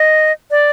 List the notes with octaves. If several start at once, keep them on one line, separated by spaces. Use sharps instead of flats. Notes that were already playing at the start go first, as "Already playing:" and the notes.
Already playing: D#5
D5